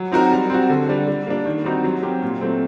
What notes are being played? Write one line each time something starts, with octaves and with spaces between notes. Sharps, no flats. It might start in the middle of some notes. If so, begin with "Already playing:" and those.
Already playing: F#3
C4 D#4 F#4 A#4
G3
C4 F#4
D3
G3 D4
G3
A#3 D4
D#3
G3 C4 D#4 F#4
F#3
C4 G4 A#4
A#2
F#3 A3 C4